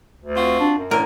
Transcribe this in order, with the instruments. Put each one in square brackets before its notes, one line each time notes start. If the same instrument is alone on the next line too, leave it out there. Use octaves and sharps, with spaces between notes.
[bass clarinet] D2
[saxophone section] C4 F4 F#4
[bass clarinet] D4
F#2
[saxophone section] A2 D3 E3 [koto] A#4